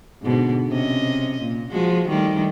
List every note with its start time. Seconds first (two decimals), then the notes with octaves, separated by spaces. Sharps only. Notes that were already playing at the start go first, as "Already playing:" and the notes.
0.22 G#2 B2 D3
0.68 C3 C#4 D#5
1.41 A#2
1.70 F3 G#3 F#4
2.09 D#3 G3 A3